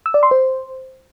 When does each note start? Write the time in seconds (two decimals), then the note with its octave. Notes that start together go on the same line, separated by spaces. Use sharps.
0.06 E6
0.14 D5
0.23 C6
0.31 C5